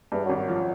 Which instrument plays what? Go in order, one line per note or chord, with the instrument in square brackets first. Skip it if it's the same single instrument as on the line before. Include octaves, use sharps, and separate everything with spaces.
[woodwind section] E2 E3 [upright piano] G2
[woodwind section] F#2 F#3
[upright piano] G#1
[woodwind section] F#2 F#3
[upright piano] F3